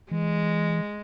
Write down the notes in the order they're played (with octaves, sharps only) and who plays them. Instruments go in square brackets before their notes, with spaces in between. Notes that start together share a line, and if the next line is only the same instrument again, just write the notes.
[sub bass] E3 [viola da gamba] G#3